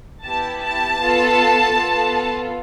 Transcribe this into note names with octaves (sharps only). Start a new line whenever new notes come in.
B3 E4 G4 A5
A5
B3 F4 A4
B3 F4 A4